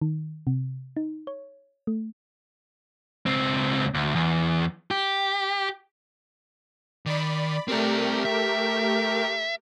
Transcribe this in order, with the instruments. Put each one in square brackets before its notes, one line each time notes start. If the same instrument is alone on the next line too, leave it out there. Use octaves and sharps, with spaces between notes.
[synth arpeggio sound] D#3
C3
D#4
C#5
A3
[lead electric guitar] C#2 C4
D2
E2
G4
[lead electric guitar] D#3 [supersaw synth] D5 B5
[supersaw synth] A3 G4 A#4 [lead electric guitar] C4 D5
[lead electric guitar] E5